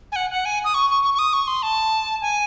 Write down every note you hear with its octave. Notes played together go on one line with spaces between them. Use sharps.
G#5
F#5
F#5
G#5
D#6
C#6
C#6
C#6
C#6
D#6
C#6
C6
A5
G#5